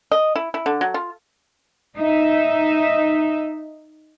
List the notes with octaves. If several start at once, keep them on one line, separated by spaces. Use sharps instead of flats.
D#5
E4
E4
D3
F#3
F4
D#4 E5